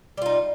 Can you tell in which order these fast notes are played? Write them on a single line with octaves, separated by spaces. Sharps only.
G3 F4 D#4